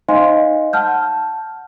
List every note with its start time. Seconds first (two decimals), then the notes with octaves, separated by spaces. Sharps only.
0.08 D#4 C5 D#5 F5 G#5 C6
0.73 F#5 A5 F6 G6